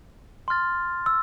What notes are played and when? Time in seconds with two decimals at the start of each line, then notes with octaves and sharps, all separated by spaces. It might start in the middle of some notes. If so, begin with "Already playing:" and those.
0.48 C6 F6 A6
1.06 E6